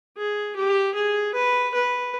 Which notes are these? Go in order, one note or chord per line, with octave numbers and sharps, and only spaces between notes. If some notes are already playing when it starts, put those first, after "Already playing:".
G#4
G4
G#4
B4
B4